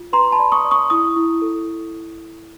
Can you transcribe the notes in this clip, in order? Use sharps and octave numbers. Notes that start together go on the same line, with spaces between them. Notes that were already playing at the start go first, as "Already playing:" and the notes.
Already playing: F4
B4 A#5 C6
A5 B5
D5
C#6 D#6
D5
C#6 D#6
E4 C#6 D#6
E4
A4